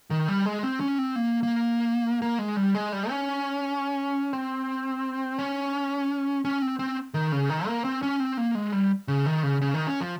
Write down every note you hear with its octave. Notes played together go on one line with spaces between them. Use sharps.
D#3
G3
G#3
C4
C#4
C4
A#3
A#3
A#3
G#3
G3
G#3
G3
C#4
C4
C#4
C#4
C4
C4
D#3
C#3
D#3
A#3
C4
C#4
C4
A#3
G#3
G3
C#3
D#3
C#3
C#3
D#3
C#4
F3